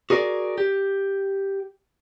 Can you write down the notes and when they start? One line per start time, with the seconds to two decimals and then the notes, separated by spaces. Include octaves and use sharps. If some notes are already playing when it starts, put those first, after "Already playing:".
0.10 F#4 G#4 A#4 D5
0.58 G4